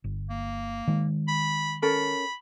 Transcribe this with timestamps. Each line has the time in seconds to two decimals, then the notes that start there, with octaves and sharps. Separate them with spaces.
0.04 G1
0.30 A#3
0.87 D#3 G#3
1.28 B5
1.82 C#4 A4 A#4 B5